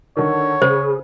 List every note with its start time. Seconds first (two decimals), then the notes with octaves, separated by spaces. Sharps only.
0.17 D3 D#3 C#5
0.62 C#3 G#4 C5